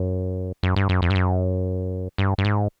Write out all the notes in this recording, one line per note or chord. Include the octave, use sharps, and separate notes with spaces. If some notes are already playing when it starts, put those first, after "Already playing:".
Already playing: F#2
F#2
G2
F#2
F2
G2
F#2
G2
G2
G#2